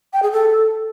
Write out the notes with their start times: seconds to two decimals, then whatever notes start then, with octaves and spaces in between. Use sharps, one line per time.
0.13 G5
0.23 G#4
0.32 A4